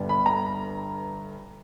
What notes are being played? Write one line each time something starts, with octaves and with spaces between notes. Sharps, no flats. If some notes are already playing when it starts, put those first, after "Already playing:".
Already playing: G1 G2 D3 G3 B3
B5
A#5